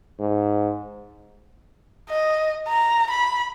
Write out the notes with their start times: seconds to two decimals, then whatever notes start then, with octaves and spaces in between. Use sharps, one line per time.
0.19 G#2
2.10 D#5
2.68 A#5
3.11 B5